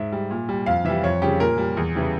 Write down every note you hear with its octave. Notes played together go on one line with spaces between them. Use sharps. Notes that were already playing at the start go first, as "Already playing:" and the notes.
Already playing: G#2 E5
G3
A#2
G3
F2 F5
E3 G3 E5
F2 C#5
C#3 G3 G4
A#2 A#4
G3
E2
C#3 E3 G3